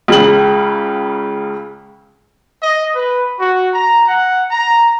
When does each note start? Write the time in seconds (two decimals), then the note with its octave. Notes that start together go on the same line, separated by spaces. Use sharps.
0.08 C#2 C#3 F#7
2.63 D#5
2.95 B4
3.39 F#4
3.74 A#5
4.07 F#5
4.51 A#5